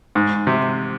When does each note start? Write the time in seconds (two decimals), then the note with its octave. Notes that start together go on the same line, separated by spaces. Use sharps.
0.15 G#2
0.47 C3